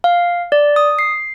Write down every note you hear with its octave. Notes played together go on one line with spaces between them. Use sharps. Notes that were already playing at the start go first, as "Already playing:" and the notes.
F5
D5
D#6
C7